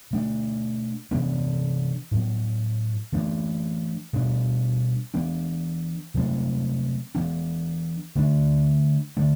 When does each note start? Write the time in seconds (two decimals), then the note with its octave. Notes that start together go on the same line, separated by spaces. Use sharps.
0.11 B2 A3 D4
1.11 C3 E3 B3 D4
2.11 A2 F#3 B3
3.12 E3 A3 D4
4.13 B2 G3 D4
5.14 E3 B3 D4
6.14 C3 F#3 A3 C4
7.15 E3 B3 D4
8.15 D3 A3 D4
9.17 D3 A3 D4